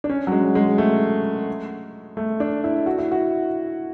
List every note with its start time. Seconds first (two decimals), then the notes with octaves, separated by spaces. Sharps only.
0.04 D4
0.09 C#4
0.27 F#3
0.32 G#3
0.55 G#3
0.78 A3
2.17 A3
2.40 D4
2.64 E4
2.86 F#4
2.98 E4
3.11 F#4